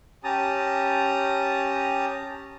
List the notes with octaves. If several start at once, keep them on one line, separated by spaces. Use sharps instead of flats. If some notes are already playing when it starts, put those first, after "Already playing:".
C#4 G4 A5 A#5 D#6